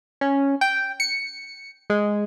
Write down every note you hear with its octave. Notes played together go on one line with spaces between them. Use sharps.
C#4
G5
C#7
G#3